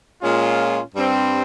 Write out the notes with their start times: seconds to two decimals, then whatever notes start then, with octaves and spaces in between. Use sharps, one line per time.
0.22 A#2 G#3 C#4 F4
0.95 G2 G3 C4